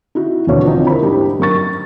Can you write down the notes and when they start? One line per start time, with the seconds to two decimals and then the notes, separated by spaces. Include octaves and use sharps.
0.15 D#4 E4 F#4
0.47 E1 D#2 B2 D3 C#5 D5
0.65 F3 C4 D#4
0.87 E4 A#4 C5 B5
1.03 G#2 D4 G4
1.39 F#2 A#4 C#6 A6